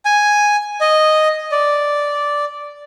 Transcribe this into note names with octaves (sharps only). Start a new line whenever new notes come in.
G#5
D#5
D5